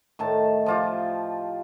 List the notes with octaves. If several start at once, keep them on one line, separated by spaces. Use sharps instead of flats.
A2 D#3 A5
F3 F4 G4